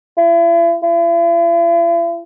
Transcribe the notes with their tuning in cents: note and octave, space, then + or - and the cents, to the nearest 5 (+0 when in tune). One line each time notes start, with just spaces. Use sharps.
E4 +40
E4 +45